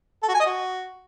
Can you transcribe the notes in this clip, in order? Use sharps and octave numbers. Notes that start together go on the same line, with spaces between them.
A4
F#4
G#5
D#5
F#4